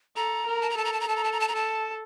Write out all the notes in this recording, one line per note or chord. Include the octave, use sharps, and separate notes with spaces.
A4 A#5
A#4
A5
A#5
A4 A5
A#5
A5
A#5
A4 A5
A#5
A5
A#5
A5
A#5
A4 A5